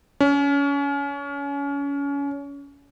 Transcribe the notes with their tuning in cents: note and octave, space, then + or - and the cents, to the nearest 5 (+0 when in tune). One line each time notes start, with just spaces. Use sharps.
C#4 +30